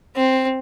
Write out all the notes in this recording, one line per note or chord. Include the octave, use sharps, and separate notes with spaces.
C4